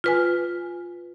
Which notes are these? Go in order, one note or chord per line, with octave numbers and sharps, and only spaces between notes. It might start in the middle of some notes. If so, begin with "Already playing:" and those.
F4 B4 G#5